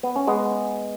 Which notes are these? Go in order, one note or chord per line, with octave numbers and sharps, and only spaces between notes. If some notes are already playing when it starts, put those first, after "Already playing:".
B3
C#4
G#3 B3